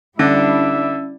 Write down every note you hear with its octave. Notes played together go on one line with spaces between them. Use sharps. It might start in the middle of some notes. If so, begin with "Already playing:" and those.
D3 G3 C#4 D4 E4 E5